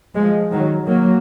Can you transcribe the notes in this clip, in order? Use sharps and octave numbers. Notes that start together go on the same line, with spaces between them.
F3 G#3
D#3 F#3
F#3 A#3